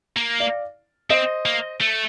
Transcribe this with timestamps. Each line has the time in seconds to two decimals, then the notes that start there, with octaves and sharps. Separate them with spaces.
0.16 A#3
0.40 D5 F5
1.10 C4 C5 D#5
1.46 A#3
1.81 A3